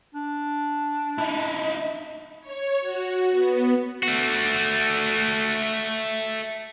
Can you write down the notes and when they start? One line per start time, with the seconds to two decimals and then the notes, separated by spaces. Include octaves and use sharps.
0.14 D4
1.18 D#4 E4
2.41 C#5
2.80 F#4
3.30 B3
4.03 A3 F#4